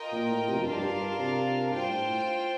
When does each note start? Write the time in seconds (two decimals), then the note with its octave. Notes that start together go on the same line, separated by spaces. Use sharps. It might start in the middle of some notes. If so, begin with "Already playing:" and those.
Already playing: F4 A#4 D#5 G5
0.12 A#2
0.30 A2
0.48 C3
0.58 F2
0.65 G2 D4 F4 A#4 F5 A5
0.79 G2
0.92 G2
1.18 C3
1.72 G2 F4 C5 G5
1.90 A2